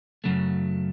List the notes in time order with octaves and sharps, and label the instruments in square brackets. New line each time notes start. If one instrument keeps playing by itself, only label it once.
[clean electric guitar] F#2 C#3 F#3 A3